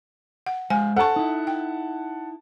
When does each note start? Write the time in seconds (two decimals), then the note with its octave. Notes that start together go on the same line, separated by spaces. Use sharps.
0.47 F#5
0.70 G#3 C5 F5 G#5
0.97 A4 C5 F#5 A5 C#6
1.16 D#4 E4
1.47 G5